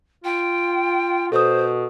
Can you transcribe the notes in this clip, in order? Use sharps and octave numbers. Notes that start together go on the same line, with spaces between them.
F4 G5
B2 A4 C5 D#6